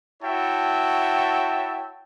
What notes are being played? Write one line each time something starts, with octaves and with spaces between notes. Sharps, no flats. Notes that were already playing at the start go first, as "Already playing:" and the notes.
E4 F#4 C#5 E5 G5 A5